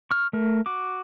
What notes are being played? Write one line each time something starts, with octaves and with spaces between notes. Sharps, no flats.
C#6 F6
A3 A#4
F#4 D6